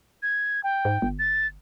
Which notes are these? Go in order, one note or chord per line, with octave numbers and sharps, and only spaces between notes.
G#6
G5
G#2
G1
A6